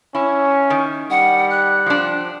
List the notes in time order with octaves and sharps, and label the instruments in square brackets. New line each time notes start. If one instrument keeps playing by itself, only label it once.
[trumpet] C#4 [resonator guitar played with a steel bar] E4
[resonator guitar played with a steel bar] D#3
[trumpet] G3 [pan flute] F#5
[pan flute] F#6
[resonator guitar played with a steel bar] F3 D4